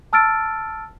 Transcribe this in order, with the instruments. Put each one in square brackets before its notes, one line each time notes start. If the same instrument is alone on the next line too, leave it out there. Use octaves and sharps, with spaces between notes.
[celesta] A5 E6 F6 A6 D7